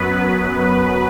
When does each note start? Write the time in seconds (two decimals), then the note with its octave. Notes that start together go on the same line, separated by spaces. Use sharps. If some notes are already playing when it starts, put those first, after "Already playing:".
Already playing: F#2 F#3 B3 B4
0.56 B4